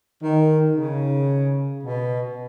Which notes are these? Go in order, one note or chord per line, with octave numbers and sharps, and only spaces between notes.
D#3
C#3
B2